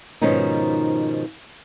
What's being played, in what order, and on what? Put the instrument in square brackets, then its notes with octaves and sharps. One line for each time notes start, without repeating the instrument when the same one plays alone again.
[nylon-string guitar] G#2 B2 D#3 F3 C#4 D#4